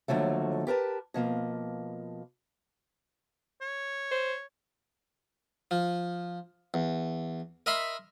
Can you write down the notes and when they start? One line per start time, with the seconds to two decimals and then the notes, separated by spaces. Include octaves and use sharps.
0.08 D#2 D3 F3 F#3 A3
0.67 G4 A#4 B4 A5
1.14 B2 F3 A#3
3.61 C#5
4.12 C5
5.71 F3
6.74 E2
7.66 A#4 D#5 E5 B5 C6